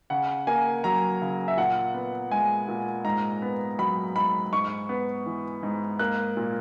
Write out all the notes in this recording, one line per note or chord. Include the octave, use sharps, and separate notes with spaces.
C#3 F#5
A#3 G#5
F#3 A#5
C#3
E5
A#2 F#5
B3
G#3 G#5
A#2
G#2 A#5
B3
F#3 B5
G#2 B5
G#2 C#6
B3
E3
G#2
A#3 F#6
A#2